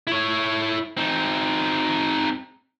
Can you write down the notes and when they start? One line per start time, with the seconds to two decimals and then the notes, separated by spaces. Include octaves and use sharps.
0.07 E4 C#5
0.97 C4 D#4